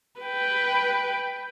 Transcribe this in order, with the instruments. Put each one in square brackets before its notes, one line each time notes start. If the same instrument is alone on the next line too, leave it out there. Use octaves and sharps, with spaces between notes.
[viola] B4 G5